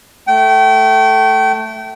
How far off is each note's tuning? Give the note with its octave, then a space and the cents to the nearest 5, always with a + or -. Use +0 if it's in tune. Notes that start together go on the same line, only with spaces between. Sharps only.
A3 +0 G5 -30